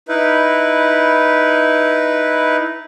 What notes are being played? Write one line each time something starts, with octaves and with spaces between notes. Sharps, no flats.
D#4 E4 B4